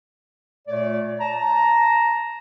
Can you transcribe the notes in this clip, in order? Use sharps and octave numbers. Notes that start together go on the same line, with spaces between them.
A#2 A3 C#5 D5
A5 A#5